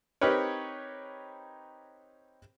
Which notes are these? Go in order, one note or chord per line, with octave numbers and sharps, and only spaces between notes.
C4 D#4 G4 A#4 B4 C#5